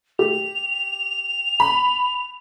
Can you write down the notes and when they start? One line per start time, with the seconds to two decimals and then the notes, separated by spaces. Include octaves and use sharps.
0.19 G4 F7
1.60 B5